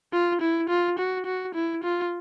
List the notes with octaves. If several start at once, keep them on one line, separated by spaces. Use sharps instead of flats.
F4
E4
F4
F#4
F#4
E4
F4